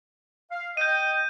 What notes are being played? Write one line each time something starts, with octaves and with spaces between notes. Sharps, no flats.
F5
D#5 G5 G6 D#7